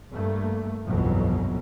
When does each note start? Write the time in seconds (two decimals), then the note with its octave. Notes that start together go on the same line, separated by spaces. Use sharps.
0.11 G2 A3 A#3
0.86 G1 C2 F2 B2 E3 F#3